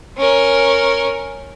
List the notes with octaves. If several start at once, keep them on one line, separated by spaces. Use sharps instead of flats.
C#4 A#4